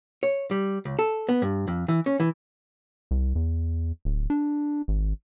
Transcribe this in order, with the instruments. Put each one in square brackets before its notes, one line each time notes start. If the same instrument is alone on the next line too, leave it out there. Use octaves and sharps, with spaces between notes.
[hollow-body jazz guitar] C#5
G3
C#2
A4
B3
G2
F2
E3
C#4
E3
[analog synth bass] C2
E2
D1
D4
G#1